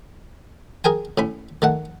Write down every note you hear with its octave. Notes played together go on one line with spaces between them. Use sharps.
G#4 A#4 G5 G#5
A2 C#4 B5
D#3 A3 F#5